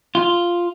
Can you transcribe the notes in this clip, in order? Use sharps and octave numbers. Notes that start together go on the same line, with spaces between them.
F4